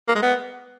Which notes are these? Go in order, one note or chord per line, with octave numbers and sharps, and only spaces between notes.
A#3
G#3
B3